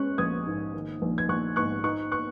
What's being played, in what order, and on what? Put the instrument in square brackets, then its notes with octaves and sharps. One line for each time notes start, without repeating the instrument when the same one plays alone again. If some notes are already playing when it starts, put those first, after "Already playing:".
Already playing: [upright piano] G#3 C#4 C#6 F#6
A#1 D#6 G#6
G#2
D#3
A#1
G#6
A#1 C#6 F#6
G#2 C#6 F#6
D#4 C#6 F#6
C#6 F#6